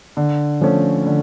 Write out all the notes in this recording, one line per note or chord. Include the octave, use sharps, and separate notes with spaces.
D3
F3 A3 C#4
D3